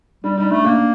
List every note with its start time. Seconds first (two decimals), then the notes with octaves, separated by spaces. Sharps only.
0.24 G3 D4
0.38 G3 D#4
0.51 A3 D4
0.64 A#3 D4